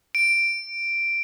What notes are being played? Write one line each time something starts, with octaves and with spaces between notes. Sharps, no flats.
D7